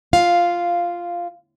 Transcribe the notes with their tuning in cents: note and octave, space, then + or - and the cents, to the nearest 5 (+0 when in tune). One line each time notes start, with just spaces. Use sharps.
F4 -5 F5 +0